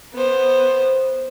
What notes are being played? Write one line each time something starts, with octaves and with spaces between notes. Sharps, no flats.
B3 C5